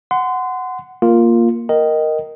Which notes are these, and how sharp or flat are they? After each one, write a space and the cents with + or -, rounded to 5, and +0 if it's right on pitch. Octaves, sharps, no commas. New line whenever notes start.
F#5 +0 C6 -30
A#3 +0 F4 +0
A#4 +0 D#5 +0 G5 -25